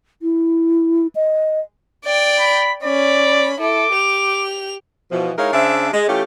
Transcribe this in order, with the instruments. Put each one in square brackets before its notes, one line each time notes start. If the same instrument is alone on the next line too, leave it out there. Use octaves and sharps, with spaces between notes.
[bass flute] E4
D#5
[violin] D5 G5
[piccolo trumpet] B5
[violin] C#4 B5 [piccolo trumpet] D5
[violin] E4 A4 [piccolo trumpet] D6
[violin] G4 F7
[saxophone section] B2 E3 F3
G#3 D#4 E4 A#4 C#5 F5
C#3 D4 C5 E5
G#3
E3 A3 C#4 F4 G4